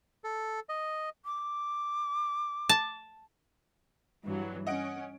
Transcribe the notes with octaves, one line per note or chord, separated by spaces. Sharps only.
A4
D#5
D6
A5
G2 E3 F#3
C#4 D#5 F#5 D7